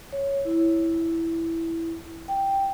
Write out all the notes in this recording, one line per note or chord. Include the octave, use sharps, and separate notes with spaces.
C#5
E4
G5